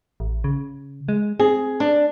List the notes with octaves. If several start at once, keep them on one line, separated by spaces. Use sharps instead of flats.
A1
C#3
G#3
C4 G#4
D4